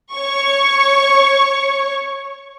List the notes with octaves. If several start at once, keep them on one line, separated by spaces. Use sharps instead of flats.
C#5 C#6